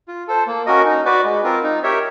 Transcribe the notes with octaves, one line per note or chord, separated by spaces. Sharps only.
F4
A4 C5
A#3
C#4 F#4 A#4 D#5
D#4
F#4 B4 D5
G#3
C4 F4 A#4
D#4
G4 A#4 C#5 E5